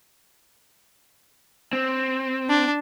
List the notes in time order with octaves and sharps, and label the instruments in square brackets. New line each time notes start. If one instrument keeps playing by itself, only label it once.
[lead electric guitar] C4
[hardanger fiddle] D4